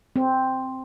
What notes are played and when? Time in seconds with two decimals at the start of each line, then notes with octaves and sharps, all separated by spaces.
0.16 C4